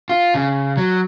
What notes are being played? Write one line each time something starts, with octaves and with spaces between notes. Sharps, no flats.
F4
C#3
F#3